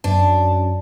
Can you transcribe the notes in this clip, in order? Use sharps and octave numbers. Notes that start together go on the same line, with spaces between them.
F#2 D4